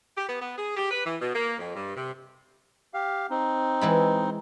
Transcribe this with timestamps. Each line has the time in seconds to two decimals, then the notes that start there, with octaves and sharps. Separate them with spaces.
0.17 G4
0.29 B3
0.42 B3
0.58 G#4
0.77 G4
0.91 B4
1.06 E3
1.22 B2
1.35 A#3
1.59 F2
1.76 G2
1.95 C3
2.94 G4 F5
3.30 C4 D#4
3.81 E3 G#3 B5